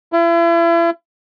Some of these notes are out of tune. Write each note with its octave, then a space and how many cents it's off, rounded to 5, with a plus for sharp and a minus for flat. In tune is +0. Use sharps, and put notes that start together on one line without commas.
E4 +40